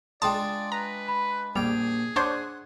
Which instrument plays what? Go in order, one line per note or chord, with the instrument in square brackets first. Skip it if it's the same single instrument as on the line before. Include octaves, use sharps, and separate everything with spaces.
[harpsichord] G#3 D4 F4 [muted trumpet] D5 [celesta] G5 C6 D#6 [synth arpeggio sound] A5
[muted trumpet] B4 [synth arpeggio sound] A#5
[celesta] B5
[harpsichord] A#1 G5 [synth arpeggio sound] G3 [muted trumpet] G#4 [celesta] F7
[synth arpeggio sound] D4 C5 C#5 [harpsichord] F#5